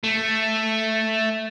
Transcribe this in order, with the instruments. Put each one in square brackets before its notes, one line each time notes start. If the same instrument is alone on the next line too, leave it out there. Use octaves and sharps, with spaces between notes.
[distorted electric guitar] A3